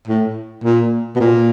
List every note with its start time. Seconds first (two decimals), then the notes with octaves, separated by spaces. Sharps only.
0.08 A2
0.64 A#2
1.15 B2
1.20 A#2